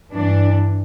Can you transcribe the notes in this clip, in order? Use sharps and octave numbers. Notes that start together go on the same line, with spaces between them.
G2 E3 D4